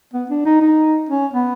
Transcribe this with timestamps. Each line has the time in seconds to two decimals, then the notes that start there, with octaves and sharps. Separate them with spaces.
0.13 B3
0.30 D4
0.45 D#4
0.61 D#4
1.09 C#4
1.33 B3